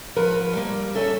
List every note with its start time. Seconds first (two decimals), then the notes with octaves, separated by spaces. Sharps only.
0.16 F3 A#4 B4 F#5
0.53 G3 A#3
0.95 C#4 A4 E5